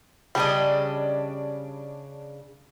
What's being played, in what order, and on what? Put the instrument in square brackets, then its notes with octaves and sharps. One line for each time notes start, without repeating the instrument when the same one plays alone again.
[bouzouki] C#3 D4 D#5 [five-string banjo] G3